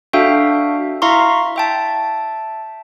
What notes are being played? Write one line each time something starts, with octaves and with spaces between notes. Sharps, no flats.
D4 F#4 A4 E5 F5 G5
E4 E5 F5 A#5 C6 C#6
E5 G5 A5